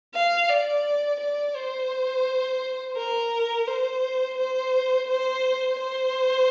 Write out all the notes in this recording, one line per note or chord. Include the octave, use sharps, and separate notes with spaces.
F5
D5
D5
C5
A#4
C5
C5
C5
C5